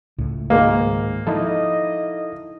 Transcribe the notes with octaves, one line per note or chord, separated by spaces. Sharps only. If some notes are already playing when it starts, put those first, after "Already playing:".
C#2 A2
G#2 D#3 G#3 A#3
F3 D#4 E4 A4 D#5